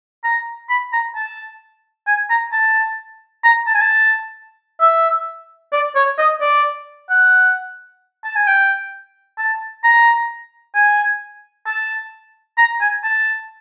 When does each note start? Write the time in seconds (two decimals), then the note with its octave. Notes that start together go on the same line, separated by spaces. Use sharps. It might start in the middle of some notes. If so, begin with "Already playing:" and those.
0.24 A#5
0.70 B5
0.93 A#5
1.16 A5
2.07 G#5
2.30 A#5
2.53 A5
3.44 A#5
3.67 A5
3.74 G#5
3.81 A5
4.81 E5
5.72 D5
5.95 C#5
6.18 D#5
6.41 D5
7.10 F#5
8.24 A5
8.35 G#5
8.47 G5
9.38 A5
9.84 A#5
10.75 G#5
11.66 A5
12.58 A#5
12.81 G#5
13.04 A5